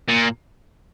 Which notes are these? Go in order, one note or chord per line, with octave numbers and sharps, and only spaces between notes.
A#2